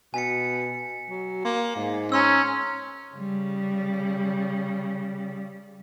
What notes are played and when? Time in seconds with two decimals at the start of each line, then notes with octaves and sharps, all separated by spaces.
0.14 B2 G#5 B6 C#7
1.10 F#3
1.45 A#3 C6
1.76 G#2
2.12 C#4 A#5 C6 E6
3.14 C#3 G3